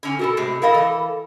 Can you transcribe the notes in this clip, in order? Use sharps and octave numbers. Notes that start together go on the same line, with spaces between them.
D3 C#4 G#5
B2 F#4 A4 A#4
A2 C3 G#3
E4 A4 A#4 D#5 F5
E3 A4